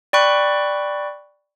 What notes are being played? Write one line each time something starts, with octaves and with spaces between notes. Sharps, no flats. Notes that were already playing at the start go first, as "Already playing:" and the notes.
D5 G5 B5 C#6 F#6